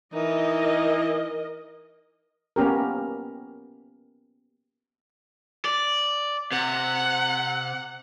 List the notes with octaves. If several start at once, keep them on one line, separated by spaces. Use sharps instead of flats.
E3 D#4 A#4 D#5
A#3 B3 C#4 G4 A#4
D5
C3 F#5